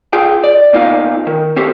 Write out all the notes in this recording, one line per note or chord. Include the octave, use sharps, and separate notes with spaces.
F4 G#4 G5
D5
B2 A#3 D#4 F4 D#5 F5
D#3
C4 F#4 G4 A4 C5